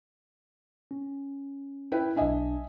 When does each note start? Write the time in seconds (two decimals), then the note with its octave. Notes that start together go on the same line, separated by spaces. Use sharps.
0.91 C#4
1.92 E4 B4 G5
2.16 B1 D4 D#5 E5 G#5